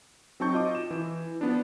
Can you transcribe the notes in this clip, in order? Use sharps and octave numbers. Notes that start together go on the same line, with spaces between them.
F#3 C4 D#4 A5 C#6 G6
F4 D#5 D6
E7
E3
F3 B3 D4